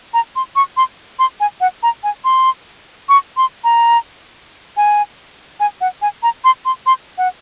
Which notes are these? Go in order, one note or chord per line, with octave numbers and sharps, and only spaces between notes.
A#5
C6
C#6
C6
C6
G#5
F#5
A#5
G#5
C6
C#6
C6
A#5
G#5
G#5
F#5
G#5
A#5
C6
C6
C6
F#5